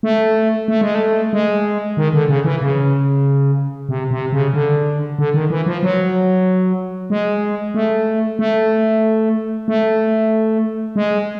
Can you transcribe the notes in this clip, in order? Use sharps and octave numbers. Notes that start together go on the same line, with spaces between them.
A3
A3
G#3
A3
G#3
D#3
D3
C#3
E3
C#3
C3
C3
C#3
D3
D3
D#3
E3
F3
F#3
G#3
A3
A3
A3
G#3